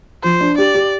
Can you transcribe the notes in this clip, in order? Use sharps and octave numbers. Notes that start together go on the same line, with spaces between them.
F3 C5
D4
G4 D5
G4